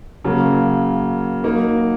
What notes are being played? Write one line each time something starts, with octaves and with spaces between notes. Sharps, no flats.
C#3 F#3 A#3
F#3 A#3 D#4